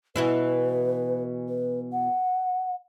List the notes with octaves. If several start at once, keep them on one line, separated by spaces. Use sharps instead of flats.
B2 E3 E4 B4
B4
F#5